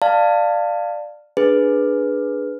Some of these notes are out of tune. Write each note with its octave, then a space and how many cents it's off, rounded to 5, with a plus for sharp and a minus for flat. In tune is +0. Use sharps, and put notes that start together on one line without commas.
D5 +15 F5 +0 A5 +25
D4 +0 G#4 +10 B4 +0